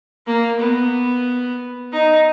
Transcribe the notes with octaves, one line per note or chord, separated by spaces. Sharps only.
A#3
B3
D#4